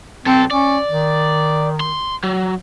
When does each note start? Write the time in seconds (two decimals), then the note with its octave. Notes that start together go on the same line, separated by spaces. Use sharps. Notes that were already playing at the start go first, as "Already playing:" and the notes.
0.26 B1 C4 A4
0.51 C#4 D5
0.90 D#3
1.80 C6
2.23 F#3